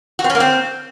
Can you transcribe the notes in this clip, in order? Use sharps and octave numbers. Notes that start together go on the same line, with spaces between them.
F#4
C4
C#4
A#3
C4